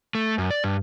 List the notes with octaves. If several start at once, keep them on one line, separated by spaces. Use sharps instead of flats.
A3
F#2
D5
G2